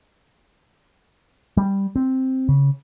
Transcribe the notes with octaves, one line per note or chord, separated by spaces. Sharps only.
G3
C4
C#3